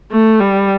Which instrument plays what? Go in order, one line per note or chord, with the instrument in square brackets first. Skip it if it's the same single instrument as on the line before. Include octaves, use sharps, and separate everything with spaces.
[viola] A3
G3